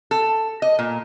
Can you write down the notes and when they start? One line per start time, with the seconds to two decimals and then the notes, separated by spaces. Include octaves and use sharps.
0.11 A4
0.62 D#5
0.79 A#2